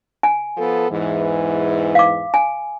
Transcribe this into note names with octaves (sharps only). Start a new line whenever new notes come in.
G#5
F3 B3 A4
E2 G#2 E3
F5 D6
G#5